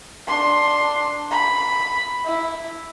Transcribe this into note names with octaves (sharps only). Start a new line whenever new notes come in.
D4 C6
B5
E4